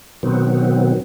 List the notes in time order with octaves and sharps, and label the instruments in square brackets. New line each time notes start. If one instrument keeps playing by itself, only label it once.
[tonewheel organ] B2 D#3 F#3 B3 C4